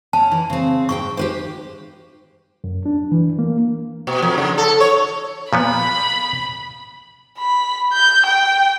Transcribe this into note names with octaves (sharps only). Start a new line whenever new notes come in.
C#4 A5
E3
C#3 C4
G#2 B4 G5 C#6
G4 B4 C5
F#2
D4
E3
A#3
B2
F2
C#3
A4
C#5
A#2 F3 B3 B5
B5
G6
G5